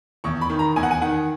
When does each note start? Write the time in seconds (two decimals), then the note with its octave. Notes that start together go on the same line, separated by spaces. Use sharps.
0.24 E2 C#6
0.41 B5
0.50 D#3
0.59 A#5
0.76 E2 G#5
0.83 F#5
0.91 G#5
1.02 D#3 F#5